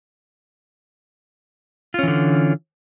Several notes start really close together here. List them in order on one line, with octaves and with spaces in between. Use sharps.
F4 C#4 E3 D3